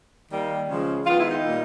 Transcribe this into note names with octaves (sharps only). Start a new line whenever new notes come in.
D#3 G3 A#3
C#3 F3 G#3
D#3 G#3 B3 F4
E4
D#4
A#2 G3 A#3